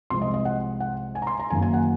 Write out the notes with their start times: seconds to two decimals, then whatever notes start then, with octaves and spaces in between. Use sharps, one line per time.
0.10 C2 C3 F3 G#3 C4 C6
0.22 D#5
0.34 D#5
0.45 F#5
0.80 F#5
1.15 G#5
1.22 A#5
1.27 C6
1.40 A#5
1.50 F#1 F#2 D#3 A#3 G#5
1.62 G#5
1.74 F#5